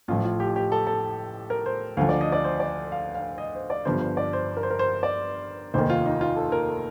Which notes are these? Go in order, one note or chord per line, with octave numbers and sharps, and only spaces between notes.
A1 A2 F3 F4
F4
G4
G4
A4
A4
A#4
C5
D2 D3 F3 F5
D5
D#5
D5
C5
D5
F5
F5
D#5
C5
D5
G1 G2 F3 C5
C5
D5
C5
A#4
C5
A#4
C5
D5
F1 D#2 D#3 C5
F4
D#4
F4
A4
A#4
A4